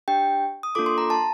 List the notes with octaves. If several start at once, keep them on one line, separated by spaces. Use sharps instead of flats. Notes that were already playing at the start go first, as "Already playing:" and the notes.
D4 G4 G5
D#6
A#3 D4 F4 A4 D6
C6
A#5
A5